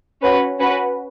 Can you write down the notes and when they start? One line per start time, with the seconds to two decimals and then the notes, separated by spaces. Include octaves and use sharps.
0.22 C#4 F#4 B4
0.58 C#4 F#4 B4